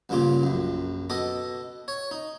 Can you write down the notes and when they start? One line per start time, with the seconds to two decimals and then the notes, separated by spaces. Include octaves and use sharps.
0.09 A1 G2 A#2 C#3 F4 D6
0.43 A#1 F#2
1.10 B2 A4 D#5 D6
1.88 C#5
2.11 D#4